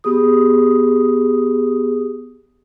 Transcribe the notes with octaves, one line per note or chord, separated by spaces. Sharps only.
B3 G4 G#4 D#6